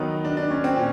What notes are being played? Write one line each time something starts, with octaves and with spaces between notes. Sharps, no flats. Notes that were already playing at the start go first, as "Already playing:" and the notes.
Already playing: D#3 F#3 B3 D#4
D4
D4
C#4
C4
A#2 C#4